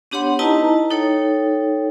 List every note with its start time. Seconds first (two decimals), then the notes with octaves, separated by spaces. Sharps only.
0.11 B3 D4 G4 C#5 F#5 C6
0.39 D#4 E4 B4 D#5 A5 A#5
0.90 D#4 A4 C#5 G5